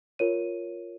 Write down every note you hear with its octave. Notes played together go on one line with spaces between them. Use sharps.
F4 A#4 C#5 D#7